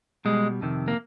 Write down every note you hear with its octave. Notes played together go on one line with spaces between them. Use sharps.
B2 G3 G#3
F2 C3 D#3
A#3